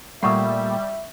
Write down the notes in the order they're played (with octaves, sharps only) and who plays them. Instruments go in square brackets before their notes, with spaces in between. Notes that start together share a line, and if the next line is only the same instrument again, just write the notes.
[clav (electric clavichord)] A#2 A3 A#3 [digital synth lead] G3 [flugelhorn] E5 [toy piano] F#5 C#6 D#6